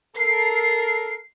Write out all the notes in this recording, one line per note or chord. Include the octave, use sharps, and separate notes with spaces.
A4 A#4 C7